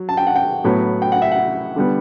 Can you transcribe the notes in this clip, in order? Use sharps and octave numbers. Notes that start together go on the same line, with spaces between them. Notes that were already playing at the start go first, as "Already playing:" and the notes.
Already playing: F#3
A5
G5
F#5
G5
A2 F#3 B3
G5
F#5
E5
F#5
D3 G3 B3